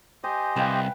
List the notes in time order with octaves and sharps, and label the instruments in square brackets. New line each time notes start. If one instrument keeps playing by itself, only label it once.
[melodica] G4 C5 D#5 [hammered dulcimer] G#5
[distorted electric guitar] C2 [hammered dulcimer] B4 F5 G5